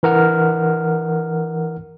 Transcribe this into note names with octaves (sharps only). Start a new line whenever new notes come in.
E3 A#4 F#5 F6